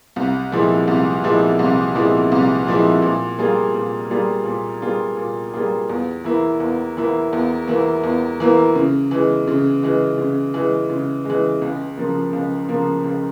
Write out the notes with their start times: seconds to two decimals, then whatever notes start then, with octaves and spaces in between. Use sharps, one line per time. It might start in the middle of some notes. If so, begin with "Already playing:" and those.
0.16 C2
0.52 A#2 F3 G#3 E4
0.88 C2
1.24 A#2 F3 G#3 E4
1.59 C2
1.95 A#2 F3 G#3 E4
2.32 C2
2.66 A#2 F3 G#3 E4
3.02 A#2
3.39 G3 A#3 F4 G#4
3.75 A#2
4.10 G3 A#3 F4 G#4
4.45 A#2
4.82 G3 A#3 F4 G#4
5.17 A#2
5.53 G3 A#3 F4 G#4
5.89 E2
6.24 E3 A#3 E4
6.60 E2
6.97 E3 A#3 E4
7.33 E2
7.67 E3 A#3 E4
8.03 E2
8.40 E3 A#3 E4
8.75 C#3
9.11 E3 G#3
9.47 C#3
9.83 E3 G#3
10.18 C#3
10.54 E3 G#3
10.89 C#3
11.25 E3 G#3
11.62 C#2
11.98 C#3 F3 A#3
12.33 C#2
12.69 C#3 F3 A#3
13.04 C#2